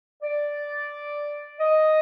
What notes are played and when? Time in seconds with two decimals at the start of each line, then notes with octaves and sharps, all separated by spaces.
0.22 D5
1.59 D#5